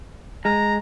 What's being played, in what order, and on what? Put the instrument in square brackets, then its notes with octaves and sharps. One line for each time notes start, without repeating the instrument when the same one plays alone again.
[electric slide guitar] G#3 [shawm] A#5